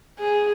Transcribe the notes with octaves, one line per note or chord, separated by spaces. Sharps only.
G#4